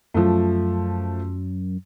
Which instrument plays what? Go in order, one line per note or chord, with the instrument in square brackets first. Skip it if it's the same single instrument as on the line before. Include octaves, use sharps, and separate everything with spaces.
[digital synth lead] F#2 [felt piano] F3 A3